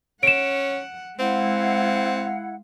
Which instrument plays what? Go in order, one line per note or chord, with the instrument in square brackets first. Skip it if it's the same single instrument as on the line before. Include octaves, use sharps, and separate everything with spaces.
[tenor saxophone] C#4 [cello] F#5 [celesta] D7 E7
[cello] G#3 F5 [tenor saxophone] C4 [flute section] E4 F#5